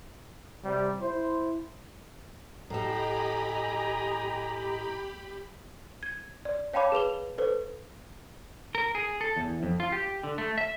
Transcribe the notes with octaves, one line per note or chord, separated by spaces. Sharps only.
C3 G3
E4 C5
A2 G4 A4 D#5 G#5 A#5 B5
G#6
D5
C#5 F5 G5 A5 B5 D6
G#4 B4 F7 G7
A4 B4 C5
A#4
G#4
A4
E2
F2
F4
G4
D3
A3
E5